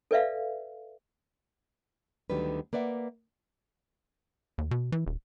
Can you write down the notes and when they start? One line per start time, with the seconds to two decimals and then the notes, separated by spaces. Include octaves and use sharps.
0.11 A4 B4 D5 E5 F5
2.30 D2 D3 D#3 F#3 G3 B4
2.73 A#3 B4 D5 E5 F#5
4.58 D#2
4.71 B2
4.92 E3
5.06 D#1